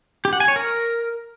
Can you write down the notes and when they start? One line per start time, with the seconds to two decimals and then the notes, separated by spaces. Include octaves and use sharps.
0.25 G4
0.33 F#5
0.40 G#5
0.48 C#5
0.56 A#4